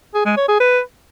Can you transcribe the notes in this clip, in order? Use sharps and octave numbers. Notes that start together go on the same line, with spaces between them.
G#4
G#3
C#5
G#4
B4